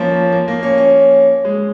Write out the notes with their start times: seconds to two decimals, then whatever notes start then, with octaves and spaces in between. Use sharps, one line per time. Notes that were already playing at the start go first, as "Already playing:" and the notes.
Already playing: F3 A#3 C#4
0.32 A#3
0.48 A#3
0.63 C#4
0.78 C#4
1.44 G#3